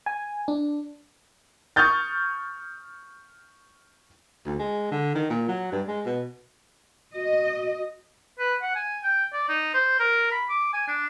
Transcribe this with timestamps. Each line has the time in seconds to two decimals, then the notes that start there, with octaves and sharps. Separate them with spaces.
0.06 G#5
0.48 D4
1.76 C#6 D#6 F6 G6 A6
4.46 D2
4.59 G#3
4.91 D3
5.15 D#3
5.30 A#2
5.48 F#3
5.72 G2
5.87 G#3
6.06 B2
7.15 F#4 D#5
8.39 B4
8.62 F#5
8.75 G#5
9.03 G5
9.33 D5
9.49 D#4
9.74 C5
10.00 A#4
10.32 B5
10.49 D6
10.73 G#5
10.87 D4